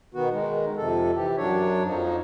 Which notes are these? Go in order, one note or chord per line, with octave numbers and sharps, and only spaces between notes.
B2 D#3 B3 F#4
D#3 G#3
F2 C3 A4
E3 G4
F#2 F#3 D4 C#5
F2 F3 D#4